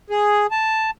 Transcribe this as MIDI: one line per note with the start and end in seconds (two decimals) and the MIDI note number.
0.10 0.47 68
0.51 0.91 81